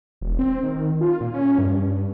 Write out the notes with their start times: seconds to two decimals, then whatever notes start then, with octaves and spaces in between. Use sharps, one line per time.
0.21 E1
0.39 C4
0.63 D#3
1.01 F4
1.21 A#2
1.34 C#4
1.59 G2